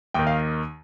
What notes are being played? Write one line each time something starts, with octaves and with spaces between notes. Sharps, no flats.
D#2 D#3 G5
F5